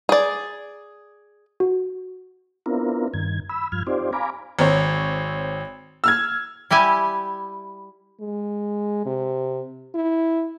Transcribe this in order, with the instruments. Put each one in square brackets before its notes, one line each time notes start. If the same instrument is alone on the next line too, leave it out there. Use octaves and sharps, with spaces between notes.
[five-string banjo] G#4 D5
[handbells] F#4
[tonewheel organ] B3 C4 D4 E4 F4 A#4
G2 D#3 G#6
B5 E6
G2 F3 F6 G#6
C4 D#4 F4 G4 C5 D5
F5 G#5 A#5 B5 D6
[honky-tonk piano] G#1 C4 C#5
E6 F6 G#6
[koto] G3 E4 G4 G#5
[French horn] G#3
C3
E4